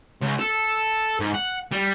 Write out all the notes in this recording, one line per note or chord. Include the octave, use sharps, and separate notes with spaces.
C#2
A4
G#2
F#5
G3